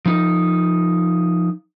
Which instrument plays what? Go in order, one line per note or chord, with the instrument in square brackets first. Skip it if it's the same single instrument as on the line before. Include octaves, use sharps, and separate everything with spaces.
[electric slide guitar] F3 D#4